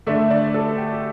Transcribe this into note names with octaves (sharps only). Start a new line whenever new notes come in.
D3 A3 D4 E5
D5
A4
G4
G4